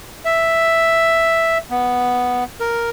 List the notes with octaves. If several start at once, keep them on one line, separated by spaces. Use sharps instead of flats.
E5
B3
A#4